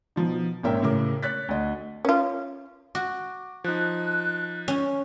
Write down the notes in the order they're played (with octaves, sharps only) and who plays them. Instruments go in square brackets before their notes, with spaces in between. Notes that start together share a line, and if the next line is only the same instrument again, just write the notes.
[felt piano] B2 F3 D#4
G#1 A#2 C#4 A#4 E5 G5
A2 C#3 A#4 D6
C#5 F#6 A6 B6
D2 D#5
[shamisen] C#4 F4
[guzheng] F#4 [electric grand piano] D6
[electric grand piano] F3 D#4 [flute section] F#6
[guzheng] C#4